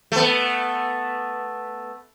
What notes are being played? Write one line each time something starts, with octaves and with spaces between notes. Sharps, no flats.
A3 B3